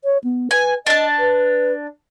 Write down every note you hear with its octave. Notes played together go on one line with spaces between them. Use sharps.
C#5
B3
B4 G#5
D4 D#5 A5
B4